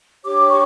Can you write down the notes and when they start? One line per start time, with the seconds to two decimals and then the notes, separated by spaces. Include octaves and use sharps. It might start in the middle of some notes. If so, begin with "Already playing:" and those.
0.25 D4 G4 C#5 D6
0.49 C#6